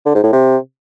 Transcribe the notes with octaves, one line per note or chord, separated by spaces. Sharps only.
D3
G#2
A2
C3